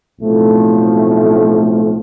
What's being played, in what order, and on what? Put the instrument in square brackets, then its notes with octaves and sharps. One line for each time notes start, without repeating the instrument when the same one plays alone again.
[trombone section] B1 A2 F3 A3 C4